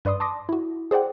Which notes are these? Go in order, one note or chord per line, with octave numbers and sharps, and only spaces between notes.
G2 B4 D5 C6 D#6
A5 C6 D6 D#6 A#6
E4 F#4
G#4 C5 D5 F#5 G5